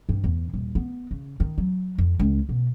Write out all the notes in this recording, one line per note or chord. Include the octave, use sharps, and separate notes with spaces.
G2
E2
D#1
B3
C#3
D#3
F#3
F2
C#2
B2